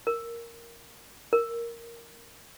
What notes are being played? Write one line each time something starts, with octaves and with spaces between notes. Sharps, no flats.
A#4
A#4